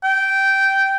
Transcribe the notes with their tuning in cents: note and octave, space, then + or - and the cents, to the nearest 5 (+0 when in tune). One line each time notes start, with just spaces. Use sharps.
G5 -10